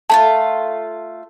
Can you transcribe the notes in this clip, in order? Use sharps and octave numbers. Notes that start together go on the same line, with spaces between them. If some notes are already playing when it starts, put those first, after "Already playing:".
A3 E4 F4 A5